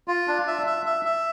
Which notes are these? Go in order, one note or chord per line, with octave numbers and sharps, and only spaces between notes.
F4
D4
E5
E5
E5
E5